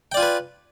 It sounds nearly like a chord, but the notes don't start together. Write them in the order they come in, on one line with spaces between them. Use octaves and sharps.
G5 D5 F4 G#5 B4